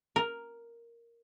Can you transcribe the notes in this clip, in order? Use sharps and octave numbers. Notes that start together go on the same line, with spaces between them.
A#4